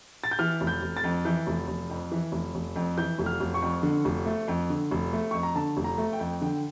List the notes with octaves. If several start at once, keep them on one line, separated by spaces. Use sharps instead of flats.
A6
G6
E3 F6
F1
G6
F1
A6
F2
E3 G6
F1
F1
F2
E3
F1
F1
F2
E3 G6
F1
F6
F1
C#6
F2
D3
F1
A3
F2
D3
F1
A3
F2 C#6
A#5
D3 A5
F1
A#5
A3
G5
F2
D3 G5